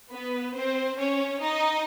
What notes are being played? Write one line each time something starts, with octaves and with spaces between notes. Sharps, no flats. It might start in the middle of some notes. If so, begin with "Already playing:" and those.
B3 B4
C4 C5
C#4 C#5
D#4 D#5